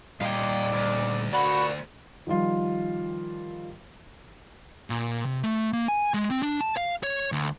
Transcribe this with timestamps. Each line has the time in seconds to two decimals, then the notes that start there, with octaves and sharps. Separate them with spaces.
0.21 A#2 G3 D5 D#5 F5 G5
0.73 D2
1.33 F#4 A#4 D5 B5
2.27 D#3 F3 G3 F4
4.90 A#2
5.26 C3
5.43 A3
5.73 A#3
5.88 G#5
6.14 G#3
6.30 C4
6.42 D4
6.61 A5
6.77 F5
7.03 C#5
7.32 D2